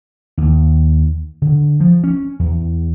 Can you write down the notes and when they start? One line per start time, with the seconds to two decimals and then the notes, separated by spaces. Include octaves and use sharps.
0.38 D#2
1.42 D3
1.80 F3
2.04 C#4
2.39 E2